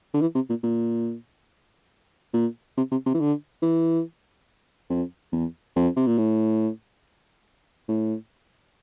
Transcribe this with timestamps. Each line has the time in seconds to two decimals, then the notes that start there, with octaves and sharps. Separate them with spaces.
0.14 D3
0.21 E3
0.35 C3
0.49 A#2
0.63 A#2
2.34 A#2
2.77 C3
2.91 C3
3.06 C3
3.14 E3
3.20 D3
3.63 E3
4.90 F2
5.32 E2
5.76 F2
5.96 C3
6.07 A#2
6.18 A2
7.89 A2